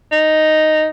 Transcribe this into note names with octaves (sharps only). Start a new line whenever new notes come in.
D#4